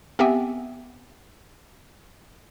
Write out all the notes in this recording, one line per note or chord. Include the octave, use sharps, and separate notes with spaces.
B3 C4 G4 E5 G5 G#5